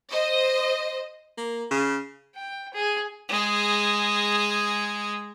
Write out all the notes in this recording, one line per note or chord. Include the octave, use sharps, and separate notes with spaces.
C5 D#5
A#3
C#3
G5
G#4
G#3 G#4